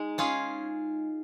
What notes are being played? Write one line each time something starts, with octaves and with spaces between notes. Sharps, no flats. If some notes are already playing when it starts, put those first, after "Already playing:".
Already playing: G#3 D#4
C#4 F4 G#4